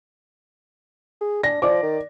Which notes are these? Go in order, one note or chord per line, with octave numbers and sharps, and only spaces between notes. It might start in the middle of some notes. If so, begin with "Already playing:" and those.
G#4
D4 A#6
F3 D5 D6
D#3